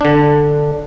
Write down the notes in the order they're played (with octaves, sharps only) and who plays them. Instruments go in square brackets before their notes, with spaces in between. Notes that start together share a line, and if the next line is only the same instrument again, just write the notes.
[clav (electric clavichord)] D3 D4